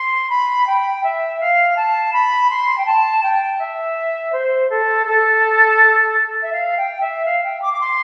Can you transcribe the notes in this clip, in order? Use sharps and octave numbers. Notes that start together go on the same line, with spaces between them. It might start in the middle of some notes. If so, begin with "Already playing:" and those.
Already playing: C6
B5
G5
E5
F5
A5
B5
C6
G5
A5
G5
E5
C5
A4
A4
E5
F5
G5
E5
F5
G5
D6
D6
C6